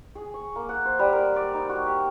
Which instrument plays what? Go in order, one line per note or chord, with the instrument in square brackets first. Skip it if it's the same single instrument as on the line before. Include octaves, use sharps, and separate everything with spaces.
[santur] G#4
C#6
A#3
F#5
C5
G3
A#4
D5
D#4
F#4
G4